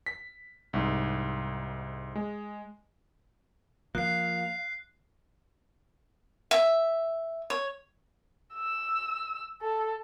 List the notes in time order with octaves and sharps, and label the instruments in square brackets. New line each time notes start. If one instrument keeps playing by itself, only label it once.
[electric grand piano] B6
C2 G#2
G#3
[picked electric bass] F3 A#3 [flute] F5 [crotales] F#6 C7
[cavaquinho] E5
C#5
[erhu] E6
A4